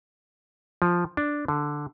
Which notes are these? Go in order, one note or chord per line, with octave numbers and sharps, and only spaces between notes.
F3
D4
D3